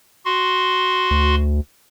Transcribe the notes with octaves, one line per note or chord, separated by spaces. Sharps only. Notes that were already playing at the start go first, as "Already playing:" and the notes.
F#4 C6
D2